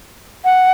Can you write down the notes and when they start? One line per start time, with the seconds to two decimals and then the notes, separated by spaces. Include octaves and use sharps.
0.44 F#5